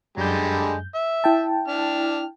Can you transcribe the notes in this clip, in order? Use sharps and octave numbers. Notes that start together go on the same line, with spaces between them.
F#2 D3 G3 G#3 G6
E5
E4 G5 A5
D4 F6